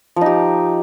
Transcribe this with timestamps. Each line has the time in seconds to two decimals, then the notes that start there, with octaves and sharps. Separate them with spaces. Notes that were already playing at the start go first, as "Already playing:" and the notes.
0.16 F3
0.21 D#4
0.26 G4